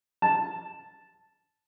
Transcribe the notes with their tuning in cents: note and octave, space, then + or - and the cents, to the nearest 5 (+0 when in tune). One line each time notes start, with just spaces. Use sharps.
A5 -5